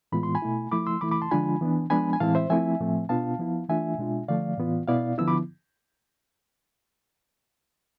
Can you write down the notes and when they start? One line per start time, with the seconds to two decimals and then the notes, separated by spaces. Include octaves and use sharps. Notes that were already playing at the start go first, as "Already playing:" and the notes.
0.12 A2 E3 G#3 B3 F4 B5
0.23 C6
0.35 G#5 B5
0.42 B2 A3 E4
0.71 F3 A3 E4 B5 D6
0.87 C6 E6
1.01 E3 A3 E4 B5 D6
1.11 B5 D6
1.22 A5 C6
1.31 D3 F3 G#3 D4 F4 G#5 B5
1.61 E3 B3 D4
1.90 F3 G#3 B3 D4 G#5 B5
2.13 G#5
2.20 A2 E3 G#3 C4 E4 F5 A5
2.35 C5 E5
2.50 F3 A3 C4 E4 E5 G#5
2.80 A2 F3 A3 C4
3.09 B2 B3 D4 F4 F5 A5
3.39 F3 B3 E4
3.69 E3 A3 D4 F4 E5 G#5
3.99 B2 G#3 D4 F4
4.28 D3 F3 A3 D5 F5
4.58 A2 E3 B3 F4
4.88 B2 B3 E4 D5 F5
5.18 D3 F3 B3 E4 E6
5.28 B5 D6